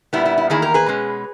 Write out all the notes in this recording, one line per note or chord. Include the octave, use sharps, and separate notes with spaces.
A#2 G3 B3 E4
E4
E4
E2 D#3 A#3 E4 G#4
G4 A#4
G#4 B4
B2 G#3 C#4